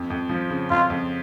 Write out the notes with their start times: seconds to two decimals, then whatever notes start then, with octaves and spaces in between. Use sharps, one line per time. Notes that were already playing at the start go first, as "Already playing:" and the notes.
Already playing: F2
0.10 F2
0.29 F3
0.50 C#3
0.70 F2 F4
0.90 F2